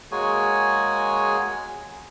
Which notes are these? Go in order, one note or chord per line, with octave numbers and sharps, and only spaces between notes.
G#3 A#3 F#4 G#4 C#5 G#5